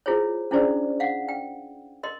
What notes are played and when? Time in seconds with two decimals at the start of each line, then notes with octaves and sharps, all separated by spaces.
0.06 E4 F4 G#4 C5 C#5
0.51 C#4 D4 E4 G#4 C5 D5
1.00 F5 F#5
1.29 G5
2.03 A#4 D#5 C6